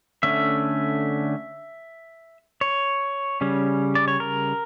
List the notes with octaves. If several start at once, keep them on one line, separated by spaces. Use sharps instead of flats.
D3 A3 C#4 E5
C#5
C#3 G3 C#4
D5
C#5
A#4